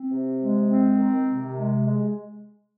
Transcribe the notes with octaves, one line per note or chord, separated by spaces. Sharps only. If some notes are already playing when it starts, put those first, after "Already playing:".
Already playing: C4
C3
G#3
C4
D#3
C3
G#3
G#3